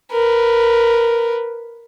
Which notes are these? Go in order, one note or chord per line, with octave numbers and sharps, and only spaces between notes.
A#4 B4